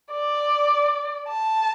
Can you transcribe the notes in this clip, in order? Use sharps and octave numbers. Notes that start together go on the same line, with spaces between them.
D5
A5